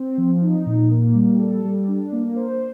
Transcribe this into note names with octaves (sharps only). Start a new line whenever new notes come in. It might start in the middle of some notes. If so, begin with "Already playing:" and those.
Already playing: C4
F3
D#4
A#2
A#3
G3
A4
G3
D4
A#3
C5